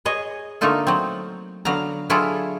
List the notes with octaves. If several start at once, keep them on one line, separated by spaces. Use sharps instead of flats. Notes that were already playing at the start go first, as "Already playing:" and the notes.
G#4 C#5 D#5
D3 A3 A#3 D#4 F4 A4
F#3 C4
D3 F#3 B3 F5 A#5
D3 F#3 E4 F4 G#4 A4